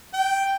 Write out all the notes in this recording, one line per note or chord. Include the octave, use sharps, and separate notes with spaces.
G5